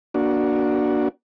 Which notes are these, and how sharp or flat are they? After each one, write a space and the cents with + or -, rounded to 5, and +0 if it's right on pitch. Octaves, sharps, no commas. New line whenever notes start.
A#3 +25 D4 +0 F#4 +0